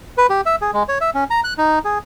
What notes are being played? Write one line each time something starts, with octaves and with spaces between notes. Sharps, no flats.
B4
G4
E5
G#4
G#3
C#5
E5
C#4
A#5
F#6
D#4
G#4